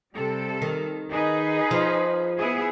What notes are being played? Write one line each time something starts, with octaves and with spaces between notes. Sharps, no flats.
C3 G3 A4
D#3
D#4 G#4 B4
F3
B3 E4 G#4